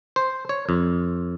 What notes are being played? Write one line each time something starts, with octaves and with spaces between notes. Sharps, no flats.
C5
C#5
F2